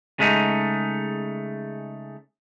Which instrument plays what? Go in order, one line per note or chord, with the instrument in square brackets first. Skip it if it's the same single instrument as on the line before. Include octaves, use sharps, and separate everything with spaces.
[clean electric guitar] C#3 G#3 A3 C#4 D#4